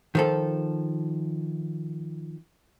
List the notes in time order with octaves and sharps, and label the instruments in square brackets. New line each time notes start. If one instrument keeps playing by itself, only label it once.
[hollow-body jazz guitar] D#3 F3 A4